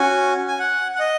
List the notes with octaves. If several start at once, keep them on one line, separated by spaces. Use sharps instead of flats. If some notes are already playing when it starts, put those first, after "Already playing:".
Already playing: C#4 F#4 G#5
G#5
F#5
F#5
D#5